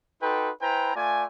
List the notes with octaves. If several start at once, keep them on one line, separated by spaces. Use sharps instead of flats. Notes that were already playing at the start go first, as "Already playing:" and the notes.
D#4 F#4 A4 B4 G5 C6
E4 B4 C5 G5 G#5 A#5
A3 F4 D5 G#5